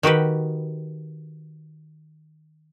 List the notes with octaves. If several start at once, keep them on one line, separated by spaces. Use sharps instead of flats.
D#3 F#4 G4 B4